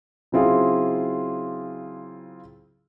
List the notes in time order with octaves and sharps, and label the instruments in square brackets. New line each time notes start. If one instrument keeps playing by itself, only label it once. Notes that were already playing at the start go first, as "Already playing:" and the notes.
[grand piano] C#3 F#3 C4 E4 F4 G#4